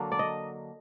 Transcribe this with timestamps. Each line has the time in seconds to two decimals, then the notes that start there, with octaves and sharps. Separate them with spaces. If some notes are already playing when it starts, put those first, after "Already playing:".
Already playing: D3 F#3 A#3 D4
0.12 D5
0.19 D#5